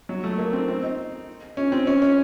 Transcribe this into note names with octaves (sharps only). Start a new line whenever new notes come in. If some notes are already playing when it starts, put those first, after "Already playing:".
F#3
A3
A#3
C4
C4
D#4
C#4
C4
C#4
C#4